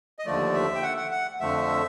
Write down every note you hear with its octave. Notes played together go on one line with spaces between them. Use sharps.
D#5
D#2 D3 F3 A3 D5
E5
G5
F#5
F#5
F#5
F2 D3 F3 A3 E5